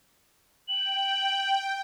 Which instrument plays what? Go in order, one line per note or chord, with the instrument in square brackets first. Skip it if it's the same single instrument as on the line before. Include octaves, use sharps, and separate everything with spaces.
[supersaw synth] G5 [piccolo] F#7